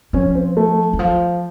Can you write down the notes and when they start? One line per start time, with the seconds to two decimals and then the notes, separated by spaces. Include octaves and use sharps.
0.13 F3 C#4
0.35 C4
0.57 A3
0.93 E3
0.99 F3